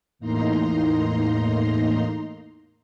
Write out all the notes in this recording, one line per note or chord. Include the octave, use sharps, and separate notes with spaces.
E2 A2 A#3 D#4 A#5 C6